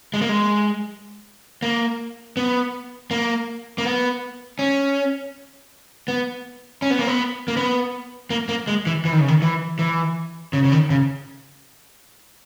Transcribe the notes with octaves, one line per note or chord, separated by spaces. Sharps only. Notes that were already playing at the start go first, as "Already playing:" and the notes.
G#3
A#3
G#3
A#3
B3
A#3
A#3
B3
C#4
B3
C#4
B3
A#3
B3
A#3
B3
A#3
A#3
G#3
E3
E3
D#3
C#3
D#3
E3
E3
C#3
C#3
D#3
C#3